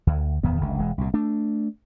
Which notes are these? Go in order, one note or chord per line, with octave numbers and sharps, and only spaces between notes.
D2
D1 E2 D#3 B3
F#1 C#2 D3
E1 E3 G#3
C2 A#2
A3 D4